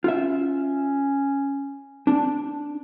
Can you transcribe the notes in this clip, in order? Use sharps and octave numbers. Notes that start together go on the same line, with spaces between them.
C#4 F4 E5
D4